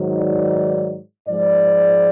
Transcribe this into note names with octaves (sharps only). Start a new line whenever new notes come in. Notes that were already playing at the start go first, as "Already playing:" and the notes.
Already playing: G#2 D#3 F#3
D5
G#2 F3 G#3 D5